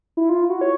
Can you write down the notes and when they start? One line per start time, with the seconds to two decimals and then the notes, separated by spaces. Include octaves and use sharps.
0.17 E4
0.29 F4
0.50 F#4
0.61 C#5